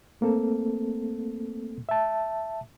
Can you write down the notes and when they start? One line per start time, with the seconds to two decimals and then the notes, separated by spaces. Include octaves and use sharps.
0.21 A3 A#3 C4 A4
1.89 E5 A5